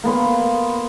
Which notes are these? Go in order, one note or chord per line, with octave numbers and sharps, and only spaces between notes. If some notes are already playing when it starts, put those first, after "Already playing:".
A#3 B3 C6